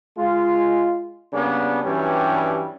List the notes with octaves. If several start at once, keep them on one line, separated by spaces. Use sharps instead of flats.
G#3 F4
C#3 G3 A#3 B3 D4
G2 E3 F#3 G3 C#4